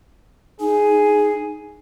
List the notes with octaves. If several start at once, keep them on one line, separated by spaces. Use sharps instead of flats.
D#4 G#4